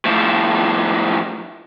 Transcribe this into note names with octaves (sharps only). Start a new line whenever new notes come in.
A2 F3